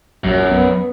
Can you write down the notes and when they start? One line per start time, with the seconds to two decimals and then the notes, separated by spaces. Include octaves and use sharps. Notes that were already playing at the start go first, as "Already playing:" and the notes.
0.24 A#1 F#2 F#3
0.51 B3